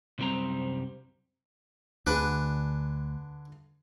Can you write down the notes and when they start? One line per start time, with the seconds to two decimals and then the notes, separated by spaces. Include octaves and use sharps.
0.19 C2 F#2 G3 C4 C5 A#5
2.07 D2 D3 D4 G#4 B4